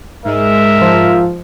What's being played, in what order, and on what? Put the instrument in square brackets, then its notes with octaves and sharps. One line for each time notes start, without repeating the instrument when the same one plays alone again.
[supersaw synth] G#2 G#3 [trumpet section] A#4 E5
[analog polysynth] F3